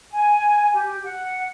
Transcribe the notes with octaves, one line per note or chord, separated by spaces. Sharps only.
G#5
G4
F#5